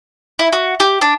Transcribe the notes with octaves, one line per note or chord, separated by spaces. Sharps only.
E4
F#4
G4
D4